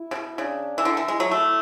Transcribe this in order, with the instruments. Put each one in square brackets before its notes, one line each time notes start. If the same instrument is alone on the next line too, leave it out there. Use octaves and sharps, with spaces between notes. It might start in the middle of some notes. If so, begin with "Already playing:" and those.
Already playing: [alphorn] E4
[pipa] C#3
B2
[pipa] C#3 [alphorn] D4
[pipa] E3
[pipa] D3 [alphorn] E4
[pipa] E3
G#3
F#3
A3